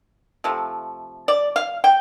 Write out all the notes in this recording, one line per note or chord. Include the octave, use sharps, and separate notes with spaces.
C3 F3 A3
D5
F5
G5